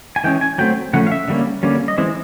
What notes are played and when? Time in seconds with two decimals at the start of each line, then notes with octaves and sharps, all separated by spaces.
0.16 G#5
0.24 E3 G#3 C#4 G5
0.41 G#5
0.58 F#3 A3 C4 G5
0.93 C#3 F3 A3 C#4 F#5
1.07 F5
1.12 E5
1.28 D3 G3 A#3 C#4
1.63 D3 G3 A#3 C#4
1.88 D#5
1.98 E3 G#3 C4 E5